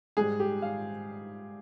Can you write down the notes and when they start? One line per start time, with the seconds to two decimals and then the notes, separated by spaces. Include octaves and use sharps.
0.17 G#2 G3 G#4
0.40 G4
0.62 F5